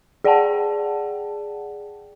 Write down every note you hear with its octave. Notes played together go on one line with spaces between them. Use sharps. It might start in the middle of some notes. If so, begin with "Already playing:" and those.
G#4 D5 F#5 G5 A5